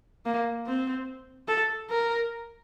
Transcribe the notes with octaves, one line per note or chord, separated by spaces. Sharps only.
A#3
C4
A4
A#4